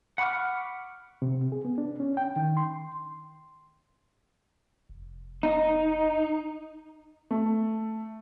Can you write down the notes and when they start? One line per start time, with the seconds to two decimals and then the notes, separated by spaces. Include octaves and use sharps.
0.18 F#5 B5 C#6 D6 F6
1.22 C3
1.52 G#4
1.65 B3
1.78 D4
2.00 C#4
2.17 G5
2.36 D#3
2.57 C6
4.89 F1
5.43 D#4
7.31 A3